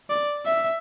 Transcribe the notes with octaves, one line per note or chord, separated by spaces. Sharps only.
D5
E5